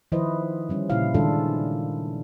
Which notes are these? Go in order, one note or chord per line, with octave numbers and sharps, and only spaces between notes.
D#3 F3 E4 B4 C5 D#5
D3 G3 C#4
A#2 C#3 E4 F4 F5
D#3 G#3 D4 F4 A4